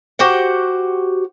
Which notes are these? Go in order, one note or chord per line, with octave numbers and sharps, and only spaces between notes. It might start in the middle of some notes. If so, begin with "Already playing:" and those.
F#4 G4 C5 F#5